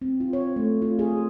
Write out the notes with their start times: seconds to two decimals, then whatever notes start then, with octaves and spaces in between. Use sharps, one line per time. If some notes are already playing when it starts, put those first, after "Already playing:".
0.02 C4
0.20 F4
0.33 C#5
0.56 A3
0.82 F4
0.99 G#4